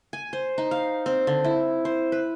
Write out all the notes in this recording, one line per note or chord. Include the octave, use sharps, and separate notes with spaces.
G#5
C5
D#4
F5
C4
D3
E4
C5
B4